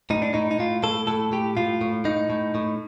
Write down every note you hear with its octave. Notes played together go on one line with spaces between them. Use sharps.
A2 D#4
D4
A2 D#4
D#4
A2 F4
A2 A4
A2 A4
A2 G4
A2 F4
A2
A2 D#4
A2
A2